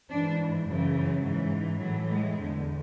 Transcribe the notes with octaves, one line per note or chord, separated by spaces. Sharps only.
G#2 E3 D4
F#2 C#3 E3
F#3
G#2 E3
A2 E3 F#3
G#3
E2 D3